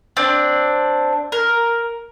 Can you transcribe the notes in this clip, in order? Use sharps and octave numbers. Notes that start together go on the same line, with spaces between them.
C4 D4
A#4